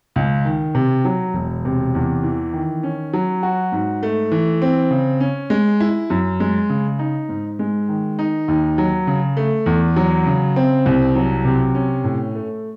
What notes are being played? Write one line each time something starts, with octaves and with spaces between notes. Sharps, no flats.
C#2
D#3
C3
F#3
E1
C3
E2
E3
D#3
C#4
F#3
F#4
G#2
A3
E3
C4
C#3
C#4
G#3
E4
F#2
G#3
C#3
D#4
G#2
G#3
D#3
D#4
D#2
F#3
C#3
A3
E2
F#3
C#3
C4
C2
F#3
C3
C#4
A2
A3